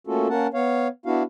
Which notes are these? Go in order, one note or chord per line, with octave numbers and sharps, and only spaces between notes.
A3 A#3 C#4 F4 F#4 A4
A#3 C#4 A#4 F#5 A5
B3 C#5 F5
B3 D4 E4 F#4 F5